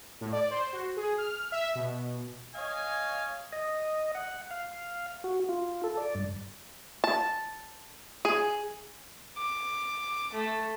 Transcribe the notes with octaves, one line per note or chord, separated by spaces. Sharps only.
A2
D5
C5
F#4
G#4
F6
E5
B2
C#5 D#5 F5 G#5
D#5
F#5
F5
F#4
F4
A4
D5
G2
A5
G#4
D6
A3